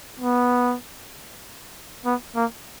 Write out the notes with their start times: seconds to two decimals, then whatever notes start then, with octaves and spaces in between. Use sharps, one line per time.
0.20 B3
2.05 B3
2.36 A#3